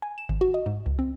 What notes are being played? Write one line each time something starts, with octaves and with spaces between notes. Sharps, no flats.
G#5
E7
G#1
F#4
D#5
G#2
C#2
C4